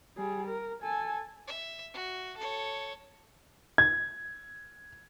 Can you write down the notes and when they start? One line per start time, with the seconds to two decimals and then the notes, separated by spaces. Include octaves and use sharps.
0.17 G3 G#4
0.47 A#4
0.82 A4 G#5
1.47 E5
1.94 F#4
2.37 A4 C#5
3.78 G#6